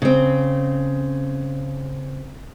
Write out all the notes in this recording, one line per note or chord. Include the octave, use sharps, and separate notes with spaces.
C#3 C4